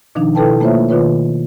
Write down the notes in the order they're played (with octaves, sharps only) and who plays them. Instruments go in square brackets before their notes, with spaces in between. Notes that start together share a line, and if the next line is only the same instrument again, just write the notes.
[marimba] B2 D#3 F3 D4 D#4
B2 E4 A4 B4 G5 A5
A3 A#3 F4 C5 C#5 E5
B2 D#3 F4 B4 C#5